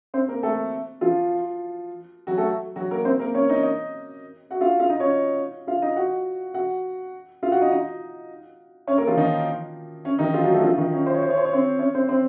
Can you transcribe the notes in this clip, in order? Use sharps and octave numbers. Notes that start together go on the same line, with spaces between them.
C4 C5
A#3 A#4
A3 A4
F3 F4
F#3 F#4
A3 A4
F#3 F#4
A#3 A#4
C4 C5
A#3 A#4
C#4 C#5
D#4 D#5
D#4 D#5
F#4 F#5
F4 F5
F4 F5
D#4 D#5
C#4 C#5
F4 F5
D#4 D#5
F#4 F#5
F#4 F#5
F4 F5
F#4 F#5
D#4 D#5
D#4 D#5
C#4 C#5
A#3 A#4
F3 F4
D#3 D#4
C#4
D#3 D#4
F3 F4
F#3 F#4
A3 A4
F3 F4
D#3 D#4
C#4
C5
C#5
C5
C#5
C5
C#5
C4 C5
C#4 C#5
C4 C5
C4 C5